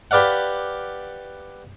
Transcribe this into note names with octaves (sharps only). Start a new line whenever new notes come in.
G4 B4 D5 F5 F#5